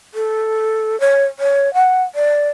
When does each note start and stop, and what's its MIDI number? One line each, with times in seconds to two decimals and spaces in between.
0.14 0.99 69
1.00 1.24 73
1.39 1.73 73
1.74 2.02 78
2.15 2.49 74